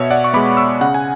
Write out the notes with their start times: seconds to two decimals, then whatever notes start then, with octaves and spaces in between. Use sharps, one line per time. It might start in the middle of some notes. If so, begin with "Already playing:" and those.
Already playing: B2 C#5 E5
0.10 D5 F#5
0.24 C#6
0.34 G#3 B3 B5 D6
0.57 C#6 E6
0.81 C#3 F#5
0.94 G#5